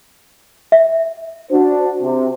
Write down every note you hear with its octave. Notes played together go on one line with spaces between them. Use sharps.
E5
D4 F#4 C5
C3